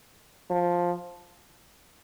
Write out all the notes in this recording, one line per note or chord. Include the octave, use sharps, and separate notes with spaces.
F3